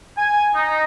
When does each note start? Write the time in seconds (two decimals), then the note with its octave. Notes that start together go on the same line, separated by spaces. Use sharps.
0.17 G#5
0.54 D#4